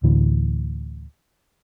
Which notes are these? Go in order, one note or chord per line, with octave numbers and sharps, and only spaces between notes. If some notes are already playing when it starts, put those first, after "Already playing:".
D2 A2 D3 E3